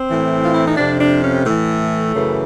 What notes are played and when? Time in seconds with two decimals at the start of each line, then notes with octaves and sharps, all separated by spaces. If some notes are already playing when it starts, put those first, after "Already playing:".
Already playing: C4
0.09 A2 E3
0.44 F4
0.55 E4
0.66 D#4
0.77 F2 C3 F3 D4
0.99 D4
1.22 C#4
1.44 A2 E3 A3
2.13 F#2 C#3 E3